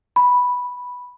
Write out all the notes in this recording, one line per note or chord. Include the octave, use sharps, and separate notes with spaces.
B5